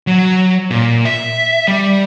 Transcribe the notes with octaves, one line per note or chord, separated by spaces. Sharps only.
F#3
A#2
E5
G3